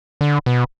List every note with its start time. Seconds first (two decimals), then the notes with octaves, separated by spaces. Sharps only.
0.21 D3
0.46 B2